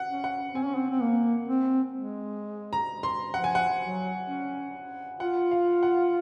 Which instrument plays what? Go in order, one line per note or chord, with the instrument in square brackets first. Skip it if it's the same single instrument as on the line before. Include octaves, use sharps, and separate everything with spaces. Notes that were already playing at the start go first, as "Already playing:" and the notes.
Already playing: [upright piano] F#5
[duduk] C#4
[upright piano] F#5
[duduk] C4 [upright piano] G#5
[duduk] C#4
C4
C4
A#3
C4
G#3
[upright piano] A#5
C6
[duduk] F3 [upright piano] F#5
[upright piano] G#5
F#5
[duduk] F#3
C#4
[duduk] F4 [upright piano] F#5
[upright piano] F5
F#5